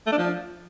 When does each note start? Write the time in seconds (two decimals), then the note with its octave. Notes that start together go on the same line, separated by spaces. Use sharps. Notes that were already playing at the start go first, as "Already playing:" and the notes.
0.06 A3
0.12 D4
0.18 F3